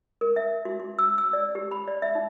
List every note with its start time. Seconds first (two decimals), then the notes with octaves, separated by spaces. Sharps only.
0.21 A#4
0.36 E5
0.65 F#4
0.80 F#4
0.99 E6
1.18 E6
1.33 D5
1.55 G4
1.71 B5
1.88 D5
2.02 E5
2.15 D#4